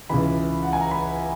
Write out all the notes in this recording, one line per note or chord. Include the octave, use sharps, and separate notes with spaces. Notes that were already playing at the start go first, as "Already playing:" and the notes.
C#2 C#3 E3 B5
F#5
G#5
A#5
B5